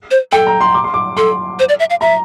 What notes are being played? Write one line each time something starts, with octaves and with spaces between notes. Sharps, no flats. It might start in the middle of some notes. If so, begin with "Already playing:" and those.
C5
A4 G5
A#5
C6
D6
C6
D6
A4 C6
C5
D5
E5
F5
E5 A#5